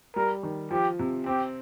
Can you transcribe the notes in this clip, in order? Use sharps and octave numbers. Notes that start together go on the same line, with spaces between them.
G3 A#4
D#3
F3 G4
C3
C4 G4